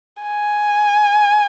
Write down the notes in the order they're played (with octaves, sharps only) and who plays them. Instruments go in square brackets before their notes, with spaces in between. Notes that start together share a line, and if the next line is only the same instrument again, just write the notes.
[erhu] G#5